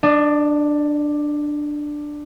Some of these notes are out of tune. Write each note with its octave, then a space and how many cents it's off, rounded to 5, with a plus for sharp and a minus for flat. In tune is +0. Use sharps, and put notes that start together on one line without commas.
D4 +10 D#5 -30